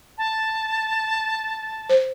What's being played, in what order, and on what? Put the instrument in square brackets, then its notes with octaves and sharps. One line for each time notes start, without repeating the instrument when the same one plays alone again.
[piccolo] A5
[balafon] C5